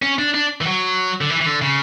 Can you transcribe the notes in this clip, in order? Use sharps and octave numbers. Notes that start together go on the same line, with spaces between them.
C#4
D4
D4
E3
F#3
D3
E3
E3
D3
C#3